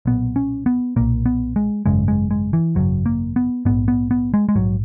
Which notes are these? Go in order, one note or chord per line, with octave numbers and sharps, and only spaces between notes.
B1 A#2 B3
C#4
B3
B1 A#2 A#3
B3
G#3
G#1 F#2 C#3 G#3
G#3
G#3
E3
G#1 F#2 C#3 F#3
A#3
B3
A#1 G#2 B3
B3
B3
G#3
G#3
A#1 G#2 F#3